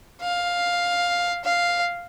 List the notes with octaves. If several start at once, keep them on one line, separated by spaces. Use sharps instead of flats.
F5
F5